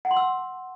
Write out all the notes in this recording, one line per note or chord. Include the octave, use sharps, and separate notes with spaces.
F#5
C6
E6